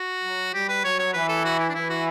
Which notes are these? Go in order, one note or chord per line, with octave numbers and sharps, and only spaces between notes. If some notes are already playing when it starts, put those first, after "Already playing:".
Already playing: F#4
F#3
G3 G4
B4
F#3 C#5
C#5
E3 B4
A4
F#4
E4
D4
E3 E4
F#4